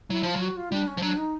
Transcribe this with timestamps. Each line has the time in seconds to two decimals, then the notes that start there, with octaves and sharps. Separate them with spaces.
0.10 F#3 E4
0.23 F3 F4
0.36 F#3
0.41 F#4
0.57 F4
0.72 G3 D4
0.88 C#4
0.97 F3
1.02 F#3 D4
1.17 D#4